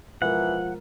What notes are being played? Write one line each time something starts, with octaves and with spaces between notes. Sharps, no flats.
B2 E3 F3 G#3 A#4 F#5